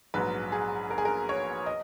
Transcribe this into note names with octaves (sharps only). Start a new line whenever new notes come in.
A#1 G#2 F#3 B4
G#4
A#4
G#4
A#4
C#5
D#5